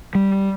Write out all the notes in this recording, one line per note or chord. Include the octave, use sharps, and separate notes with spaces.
G3